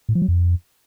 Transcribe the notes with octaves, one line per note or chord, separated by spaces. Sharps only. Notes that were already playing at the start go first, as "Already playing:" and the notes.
A2
F3
F#3
F2